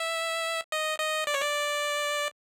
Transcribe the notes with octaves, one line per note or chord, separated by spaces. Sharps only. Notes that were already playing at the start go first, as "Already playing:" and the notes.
Already playing: E5
D#5
D#5
D5
C#5
D5